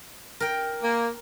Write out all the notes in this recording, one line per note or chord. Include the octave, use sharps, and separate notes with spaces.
A#4 G5
A#3